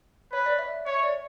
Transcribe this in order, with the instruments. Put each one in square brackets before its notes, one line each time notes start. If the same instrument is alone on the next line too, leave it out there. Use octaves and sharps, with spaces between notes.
[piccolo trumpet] B4 [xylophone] C#5
[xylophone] D5
E5
[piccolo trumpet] C#5 [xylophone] E5
[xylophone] D5